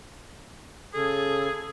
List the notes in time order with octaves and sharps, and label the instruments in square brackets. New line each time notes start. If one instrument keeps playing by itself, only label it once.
[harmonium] C#3 [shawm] G#4 [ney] A4